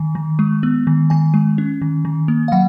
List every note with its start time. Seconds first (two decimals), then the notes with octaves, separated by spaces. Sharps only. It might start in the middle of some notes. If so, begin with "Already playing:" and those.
Already playing: D#3
0.15 D#3
0.39 G#3
0.63 B3
0.87 D#3
1.10 D#3 G#5
1.34 G#3
1.58 C#4
1.82 D#3
2.05 D#3
2.28 A#3
2.48 F5
2.52 F#3 F#5